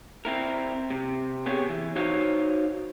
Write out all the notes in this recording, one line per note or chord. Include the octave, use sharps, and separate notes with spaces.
C4 E4 A#4
C3
B3 G4 G#4 C#5
E3
D#4 F#4 C5 C#5 D#5 F5